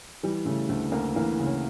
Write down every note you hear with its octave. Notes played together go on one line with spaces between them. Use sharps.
E3 G3
C#3 A3
D2 A3
D2 A#3
E3 A#3
C#3
C#4